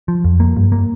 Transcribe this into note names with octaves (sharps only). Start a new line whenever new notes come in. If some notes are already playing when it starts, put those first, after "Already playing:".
F3
F2
A#3
G2
A#3